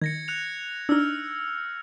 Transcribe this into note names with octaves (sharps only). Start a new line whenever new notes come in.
D#3 G#6 A#6 C#7
F#6 C#7 F7
D4 D#4 E6 F6